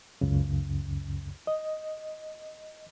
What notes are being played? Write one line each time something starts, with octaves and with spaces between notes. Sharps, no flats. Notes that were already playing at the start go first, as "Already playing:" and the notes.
C#2 F#2 C#3
D#5